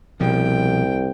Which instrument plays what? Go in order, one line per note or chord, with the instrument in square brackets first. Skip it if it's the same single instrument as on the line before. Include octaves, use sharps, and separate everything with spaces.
[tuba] C2 [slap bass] B2 F3 [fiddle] G5